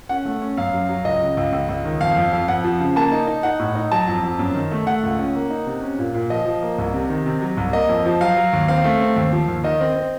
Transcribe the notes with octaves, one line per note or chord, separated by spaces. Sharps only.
C#4 F#5
A3
C#4
F#2 F5
F#3
F#3
C#2 D#5
C#3
C#2
C#2
C#2
D#3
F2 F5
F2
F2
F2 F#5
F3
C#3
A#3 A5
D#4
D#4
D#4 F#5
A2
D#4
F#3 A5
F2
F2
F#2
D#3
A3
A3 F#5
C#2
C#4
A#3
D#4
C3
C#4
A#2
A#2
F3 D#5
F3
A#3
C2
C3
D#3
C3
F#3
C2
A#3 D#5
F2
F3
F#3 F5
F#3
D#2
C4 F5
A3
C4
D#2
F3
D#2
D#3 D#5
C4
C4